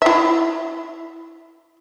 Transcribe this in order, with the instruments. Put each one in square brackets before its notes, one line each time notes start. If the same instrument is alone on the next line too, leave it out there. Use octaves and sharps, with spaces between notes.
[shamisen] E4 E5